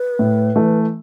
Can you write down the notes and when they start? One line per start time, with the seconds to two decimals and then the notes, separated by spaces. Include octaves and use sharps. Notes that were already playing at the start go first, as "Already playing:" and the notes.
Already playing: B4
0.19 A2
0.56 E3 A3